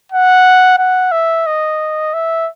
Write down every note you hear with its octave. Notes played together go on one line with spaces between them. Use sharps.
F#5
F#5
E5
D#5
E5